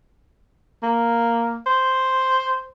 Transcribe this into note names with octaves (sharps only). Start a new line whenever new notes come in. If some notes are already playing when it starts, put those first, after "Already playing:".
A#3
C5